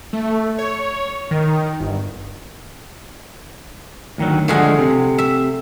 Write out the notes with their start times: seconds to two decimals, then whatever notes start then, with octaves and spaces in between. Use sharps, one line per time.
0.13 A3
0.58 C#5
1.31 D#3
1.80 G1
4.18 D2 D#3 F#3
4.48 D3 F3 G#3 A3 G#4 F#5
4.79 C3
5.18 E5